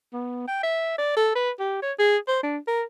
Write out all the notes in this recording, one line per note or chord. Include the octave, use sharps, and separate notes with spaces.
B3
G5
E5
D5
A4
B4
G4
C#5
G#4
C5
D4
A#4